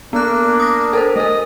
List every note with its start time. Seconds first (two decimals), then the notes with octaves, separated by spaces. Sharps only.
0.13 A#3 B3 D4 F#6
0.60 D#6 A#6
0.93 A4 A#4 C5
1.16 A3 A#4 D#5